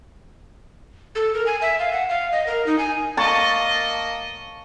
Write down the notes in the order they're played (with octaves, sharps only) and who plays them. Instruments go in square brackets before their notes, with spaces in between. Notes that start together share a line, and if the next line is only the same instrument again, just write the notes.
[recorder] A4
A#4
G#5
E5
F5
F#5
F5
D#5
A#4
D#4
G#5
[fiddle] A#3 D#5 [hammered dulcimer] A5 C#6